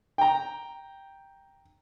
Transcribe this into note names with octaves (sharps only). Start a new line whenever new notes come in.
G5 A#5